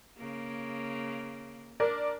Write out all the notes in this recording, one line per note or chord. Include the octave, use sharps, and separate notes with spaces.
C#3 A#3
D4 A#4 D5